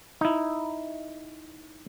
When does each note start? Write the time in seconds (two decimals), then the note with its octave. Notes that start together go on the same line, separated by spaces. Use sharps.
0.21 D#4 E4